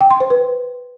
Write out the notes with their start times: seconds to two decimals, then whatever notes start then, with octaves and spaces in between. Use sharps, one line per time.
0.01 G5
0.10 C6
0.20 C5
0.30 B4